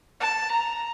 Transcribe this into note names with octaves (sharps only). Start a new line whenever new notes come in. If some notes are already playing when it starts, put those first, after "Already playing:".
A5
A#5